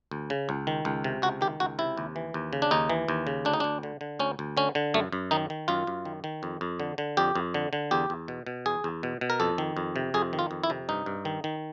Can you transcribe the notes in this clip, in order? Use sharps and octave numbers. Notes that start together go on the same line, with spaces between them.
D2
C#3
C#2
D#3
C#2
C3
C#2 F#4
D#3 G4
C#2 F#4
C3 E4
D#2
E3
D#2
C#3
D4
D#2 D#4
E3
D#2
C#3
D2 D4
D#4
D2 D4
D3
D3
D2 C#4
D2
D3 C#4
D3
F#2 A3
F#2
D#3 D#4
D#3
F#2 F4
F#2
D#3
D#3
F2
F2
D3
D3
F2 G4
F2
D3
D3
E2 G4
E2
B2
B2
E2 G#4
E2
B2
B2
A#4
F2 A4
D#3
F2
C3
F2 G#4
D#3
F4
F2
E4
C3
G2 D#4
G2
D#3
D#3